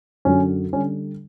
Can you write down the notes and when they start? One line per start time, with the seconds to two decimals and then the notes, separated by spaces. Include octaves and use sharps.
0.25 F#2 D3 F#3 C#4
0.72 D3 G3 C#4